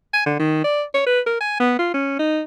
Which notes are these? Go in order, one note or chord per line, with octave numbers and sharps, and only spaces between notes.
G#5
D3
D#3
D5
C#5
B4
A#4
G#5
B3
F4
C#4
D#4